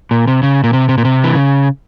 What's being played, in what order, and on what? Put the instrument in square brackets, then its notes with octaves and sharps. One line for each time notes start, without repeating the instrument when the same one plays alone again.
[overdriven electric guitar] A#2
C3
C#3
A#2
C3
C3
A#2
C3
E3
C#3